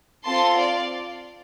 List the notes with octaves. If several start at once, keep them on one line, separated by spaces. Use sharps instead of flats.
C4 F4 A4 A5 C6
D5 F5